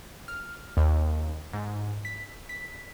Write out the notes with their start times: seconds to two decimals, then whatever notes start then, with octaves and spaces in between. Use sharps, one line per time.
0.28 F6
0.77 D#2
1.53 G#2
2.05 B6
2.49 B6